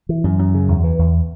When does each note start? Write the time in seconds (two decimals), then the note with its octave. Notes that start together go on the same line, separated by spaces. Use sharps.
0.09 E3
0.24 F#2
0.39 F#2
0.54 C#3
0.68 E2
0.84 E3
0.99 E2